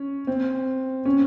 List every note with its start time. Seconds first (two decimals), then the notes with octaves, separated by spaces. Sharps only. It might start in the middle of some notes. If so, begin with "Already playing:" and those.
Already playing: C#4
0.27 C4
1.05 C#4